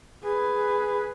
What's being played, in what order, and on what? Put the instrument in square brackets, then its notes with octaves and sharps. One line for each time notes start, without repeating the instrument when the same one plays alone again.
[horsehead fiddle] G#4 B4